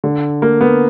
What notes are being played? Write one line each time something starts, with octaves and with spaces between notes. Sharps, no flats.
D3
A#3
B3